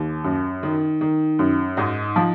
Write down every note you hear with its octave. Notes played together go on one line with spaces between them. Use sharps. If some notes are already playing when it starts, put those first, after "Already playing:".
Already playing: D#2
F#2
D#3
D#3
F#2
G#2 D#4
F3